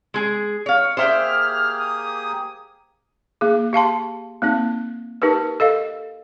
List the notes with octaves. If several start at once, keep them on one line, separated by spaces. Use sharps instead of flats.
G#3 G#4
C#5 F5
A#3 G4 G#4 C5 E5 G5 F6
D#6
A#3 G#4
G4 F5 A5 C6
A#3 C4 D#4
D#4 G4 A#4 B4
A4 D#5 F5